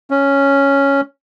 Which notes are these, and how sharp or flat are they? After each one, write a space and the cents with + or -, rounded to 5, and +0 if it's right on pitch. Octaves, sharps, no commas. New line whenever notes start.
C#4 +0